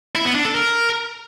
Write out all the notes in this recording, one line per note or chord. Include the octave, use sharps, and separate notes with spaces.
E4
B3
D4
A4
A#4